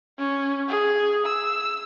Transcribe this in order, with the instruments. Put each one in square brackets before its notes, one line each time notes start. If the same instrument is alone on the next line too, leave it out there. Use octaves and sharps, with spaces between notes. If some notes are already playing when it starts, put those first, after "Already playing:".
[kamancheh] C#4
G#4
E6